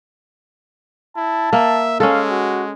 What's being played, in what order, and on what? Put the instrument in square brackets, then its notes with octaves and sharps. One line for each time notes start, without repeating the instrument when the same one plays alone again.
[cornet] E4 [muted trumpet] A5
[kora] A#3 [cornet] E5
[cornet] G#3 [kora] C#4 A4 [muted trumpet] F5
[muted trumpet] F#4